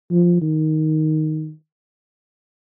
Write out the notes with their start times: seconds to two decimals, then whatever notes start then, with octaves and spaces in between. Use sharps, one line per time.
0.11 F3
0.42 D#3